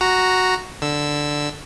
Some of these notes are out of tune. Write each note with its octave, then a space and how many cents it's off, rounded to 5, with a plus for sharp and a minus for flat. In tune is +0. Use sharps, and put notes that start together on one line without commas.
F#4 +0 A#5 +0
D3 +0 E6 +0